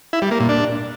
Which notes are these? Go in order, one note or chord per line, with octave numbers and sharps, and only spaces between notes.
E4
G3
A#3
A#2
D4